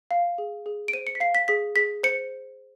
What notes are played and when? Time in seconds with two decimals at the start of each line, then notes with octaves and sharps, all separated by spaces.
0.11 F5
0.38 G#4
0.66 G#4
0.88 D7
0.93 C5 D#7
1.07 C#7
1.15 B6
1.20 F5 C7
1.35 B6
1.48 G#4 B6
1.76 G#4 B6
2.03 C5 C#7